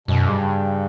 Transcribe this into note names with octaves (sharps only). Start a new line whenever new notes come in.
F#2 B2
G2 C#3